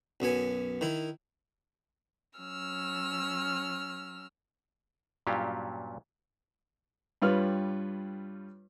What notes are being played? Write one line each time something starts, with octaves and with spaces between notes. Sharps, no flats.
B1 F#2 B3 G#5
D#3 E4
F#3 C#4 E6 F6
G2 A#2 F#3 C#4 F4 G4
G2 G3 F4 B4 C#5 F6